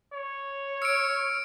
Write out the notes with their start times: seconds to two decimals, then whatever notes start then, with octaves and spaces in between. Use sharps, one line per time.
0.13 C#5
0.82 E6 F6 C#7 D7